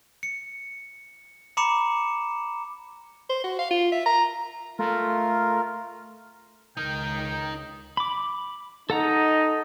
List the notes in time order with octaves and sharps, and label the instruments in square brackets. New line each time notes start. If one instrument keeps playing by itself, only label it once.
[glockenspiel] C#7
A#5 B5 D6 C#7 E7
[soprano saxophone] C5
F#4
F5
F4
E5
A#5
[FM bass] A3 [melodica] F4 A#4
[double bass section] C#2 [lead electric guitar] D#4 A#4 [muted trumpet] G5
[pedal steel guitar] B5 D6
[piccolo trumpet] D#4 [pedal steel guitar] A4 F#5 A#5